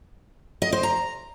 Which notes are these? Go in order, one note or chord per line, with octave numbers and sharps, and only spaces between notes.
D#5
C5
A#5